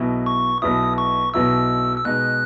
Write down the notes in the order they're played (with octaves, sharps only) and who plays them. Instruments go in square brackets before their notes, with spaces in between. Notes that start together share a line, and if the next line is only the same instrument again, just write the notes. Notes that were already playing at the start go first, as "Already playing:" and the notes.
Already playing: [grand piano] B1 B2 F#3 B3 E4
[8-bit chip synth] C#6
[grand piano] B1 B2 F#3 B3 E4 [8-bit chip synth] D#6
[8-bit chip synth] C#6
[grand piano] B1 B2 F#3 B3 E4 [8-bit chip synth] E6
[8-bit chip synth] E6
[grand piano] B2 G#3 D#4 [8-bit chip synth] F#6